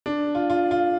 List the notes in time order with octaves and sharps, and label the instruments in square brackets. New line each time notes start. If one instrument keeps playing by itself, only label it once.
[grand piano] D4
F4
F4
F4